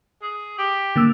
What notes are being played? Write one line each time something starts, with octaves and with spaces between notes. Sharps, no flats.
G#4
G4
D3 A#3 E6